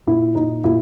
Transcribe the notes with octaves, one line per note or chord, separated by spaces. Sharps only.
A#2 E4
A#2 D#4
A#2 E4